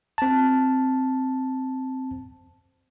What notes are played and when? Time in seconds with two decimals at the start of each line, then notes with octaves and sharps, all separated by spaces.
0.18 C4 A5